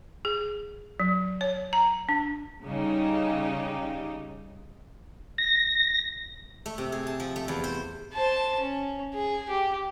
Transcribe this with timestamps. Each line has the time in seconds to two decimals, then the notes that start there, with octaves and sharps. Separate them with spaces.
0.25 G#4
1.00 F#3
1.41 C#5
1.73 A#5
2.09 D4
2.64 C#3 G3 D#4 G4
5.38 A#6
6.66 A3
6.78 C3
6.92 G#4
7.07 A5
7.20 F3
7.36 A3
7.48 E2
7.64 C5
8.13 C5 A5
8.60 C#4
9.14 G#4
9.49 G4